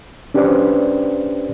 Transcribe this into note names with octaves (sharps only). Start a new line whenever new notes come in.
C#4 D4 G4 B4 C5 D5